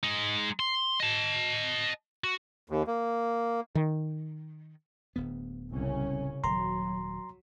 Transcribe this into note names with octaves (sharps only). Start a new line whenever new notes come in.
G#3 D#4
C6
D#5 A5
F#4
D#2
A#3
D#3
D1 D2 B3
C2 C#3 C#4
D#1 F#3 A#5 C6